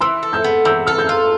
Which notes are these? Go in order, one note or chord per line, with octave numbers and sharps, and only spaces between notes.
E3 C6 E6
A4
E6 G6
B3
E3 E6 G6
A4 F6
E6 G6
F4